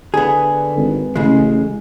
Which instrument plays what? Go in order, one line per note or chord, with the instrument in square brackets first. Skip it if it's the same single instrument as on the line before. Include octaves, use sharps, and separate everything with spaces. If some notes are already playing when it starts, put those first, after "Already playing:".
[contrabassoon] D3 [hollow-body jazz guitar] B3 G#4
[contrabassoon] G#1
[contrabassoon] A1 [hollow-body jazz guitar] C#3 G#3